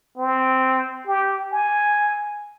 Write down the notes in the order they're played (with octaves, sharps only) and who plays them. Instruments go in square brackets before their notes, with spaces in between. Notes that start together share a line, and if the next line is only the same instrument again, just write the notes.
[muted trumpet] C4
G4
G#5